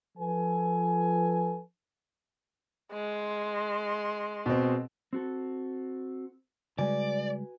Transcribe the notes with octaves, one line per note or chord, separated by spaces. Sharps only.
F3 A4 B4 G#5
G#3 C6
B2 C4
C4 F#4 A4
C#3 G3 G#3 F#4 B4 D5 G#5